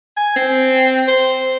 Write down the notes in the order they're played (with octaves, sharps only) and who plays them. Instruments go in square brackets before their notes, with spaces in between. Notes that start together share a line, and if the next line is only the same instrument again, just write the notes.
[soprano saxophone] G#5
C4
C5